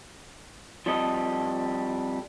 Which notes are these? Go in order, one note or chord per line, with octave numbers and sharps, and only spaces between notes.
F3 G3 C4 A4 D#5